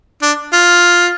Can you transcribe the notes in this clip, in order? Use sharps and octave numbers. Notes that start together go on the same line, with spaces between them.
D4
F4